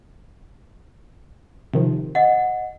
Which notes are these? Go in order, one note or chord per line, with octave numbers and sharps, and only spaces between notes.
C3 D#3 F3
D#5 F#5